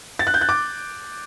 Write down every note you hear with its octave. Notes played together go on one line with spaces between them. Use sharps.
A6
F#6
G6
F#6
D6